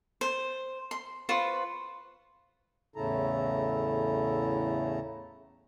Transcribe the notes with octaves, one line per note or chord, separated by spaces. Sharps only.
C5
C6
F4 B4 C5 C#6
E2 A2 C#3 E4 A4 A#5